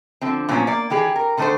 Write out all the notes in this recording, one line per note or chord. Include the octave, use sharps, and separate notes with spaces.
D3 F3 C4
A#2 F3 F#3 B3 C#4
A#3 D5
D#3 E3 G4 G#4
A#4
D3 D#3 A3 D4 A4 C5